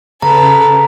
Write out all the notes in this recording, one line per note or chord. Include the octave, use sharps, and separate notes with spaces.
C#3 A4 B4 A#5